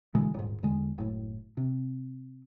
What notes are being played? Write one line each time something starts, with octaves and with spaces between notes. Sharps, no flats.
B2 D3 E3 G#3
D#1 G#2
E2 D3 G#3
F#1 A2
C3